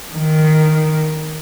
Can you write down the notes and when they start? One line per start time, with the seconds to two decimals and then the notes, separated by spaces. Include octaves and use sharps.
0.15 D#3